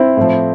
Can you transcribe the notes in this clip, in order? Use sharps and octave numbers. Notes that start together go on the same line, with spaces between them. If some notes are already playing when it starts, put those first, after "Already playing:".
Already playing: C4 E4
A2 F3